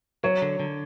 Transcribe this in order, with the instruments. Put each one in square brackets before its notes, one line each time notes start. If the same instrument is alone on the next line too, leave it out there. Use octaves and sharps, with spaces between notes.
[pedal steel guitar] F#3 [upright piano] C#5
[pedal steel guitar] D3
D3